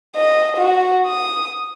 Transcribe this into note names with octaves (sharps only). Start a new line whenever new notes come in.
D#5
F#4
D#6